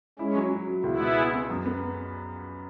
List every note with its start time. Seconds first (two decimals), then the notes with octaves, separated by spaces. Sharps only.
0.19 G#3 C#4 E4
0.36 F#3
0.51 F#3
0.68 F#3
0.84 C#2 B3 E4
1.00 B2
1.16 G#4
1.33 B3
1.50 F#2
1.65 B3